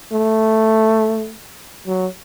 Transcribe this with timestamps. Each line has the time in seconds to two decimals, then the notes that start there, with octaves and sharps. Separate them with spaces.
0.13 A3
1.87 F#3